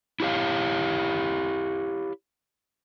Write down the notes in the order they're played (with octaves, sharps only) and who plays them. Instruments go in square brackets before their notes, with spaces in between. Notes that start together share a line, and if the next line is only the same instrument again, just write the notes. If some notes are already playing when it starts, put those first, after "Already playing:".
[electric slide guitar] E4 G4 C#5 F5